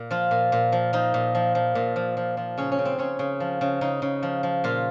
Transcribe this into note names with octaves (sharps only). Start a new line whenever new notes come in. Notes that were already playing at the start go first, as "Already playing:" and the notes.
Already playing: A#2
F3 F4
A#2
A#2
F3
F3 D#4
A#2
F3
F3
A#2
F3
F3
F3
C#3 C#4
C#4
C#3
C4
C#3 C#4
C#3
F3
C#3
C#3 D#4
C#3
F3
F3
A#2 F4